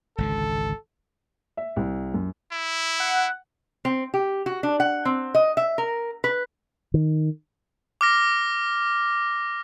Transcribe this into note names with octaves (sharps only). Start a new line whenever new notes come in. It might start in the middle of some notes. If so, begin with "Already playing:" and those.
G#1 C#2 D3 A4
E5
C2
F#2
E4
F#5
C4
G4
F#4
D4
F#5
C4
D#5
E5
A#4
B4
D#3
D6 F6 A#6